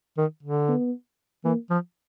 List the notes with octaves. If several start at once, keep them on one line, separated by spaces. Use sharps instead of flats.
D#3
D3
B3
E3 A#3
F3